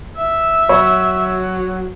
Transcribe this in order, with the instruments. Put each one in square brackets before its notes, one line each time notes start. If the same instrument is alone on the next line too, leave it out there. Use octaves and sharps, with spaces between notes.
[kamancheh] E5
[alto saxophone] F#3 [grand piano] C#5